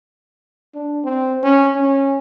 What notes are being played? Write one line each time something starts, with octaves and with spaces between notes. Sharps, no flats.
D4
C4
C#4
C#4